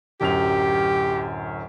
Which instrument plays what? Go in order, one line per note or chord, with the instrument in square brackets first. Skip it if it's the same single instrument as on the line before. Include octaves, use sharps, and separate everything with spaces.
[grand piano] D1 F#2 F7 [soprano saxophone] G4